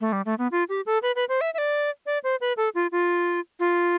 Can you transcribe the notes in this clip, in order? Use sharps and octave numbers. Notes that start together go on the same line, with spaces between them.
A3
G3
A3
B3
F4
G4
A4
B4
B4
C5
E5
E5
D5
D5
C5
B4
A4
F4
F4
F4